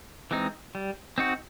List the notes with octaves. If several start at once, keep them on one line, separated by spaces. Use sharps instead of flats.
E3 G#3 C4 D#4
G3
C4 D#4 F#4